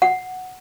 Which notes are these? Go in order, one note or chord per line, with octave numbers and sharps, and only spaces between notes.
F#5